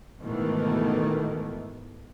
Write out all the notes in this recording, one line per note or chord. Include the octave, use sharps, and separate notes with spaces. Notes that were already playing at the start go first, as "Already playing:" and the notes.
G#2 B2 D#3 E3 A3